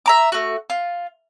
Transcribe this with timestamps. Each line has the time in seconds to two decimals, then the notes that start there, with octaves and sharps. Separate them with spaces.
0.06 E5 A#5 D6
0.32 A3 F#4
0.70 F4